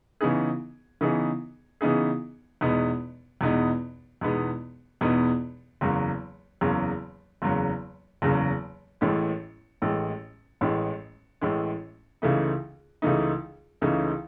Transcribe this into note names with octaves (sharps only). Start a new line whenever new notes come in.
C#3 E3 B3 D#4 G#4
C#3 E3 B3 D#4 G#4
C#3 E3 B3 D#4 G#4
E2 B2 G#3 B3 D#4
E2 B2 G#3 B3 D#4
E2 B2 G#3 B3 D#4
E2 B2 G#3 B3 D#4
F#1 E2 C#3 F#3
F#1 E2 C#3 F#3
F#1 E2 C#3 F#3
F#1 E2 C#3 F#3
A1 A2 E3 G#3
A1 A2 E3 G#3
A1 A2 E3 G#3
A1 A2 E3 G#3
C#2 C#3 E3 A3 D#4
C#2 C#3 E3 A3 D#4
C#2 C#3 E3 A3 D#4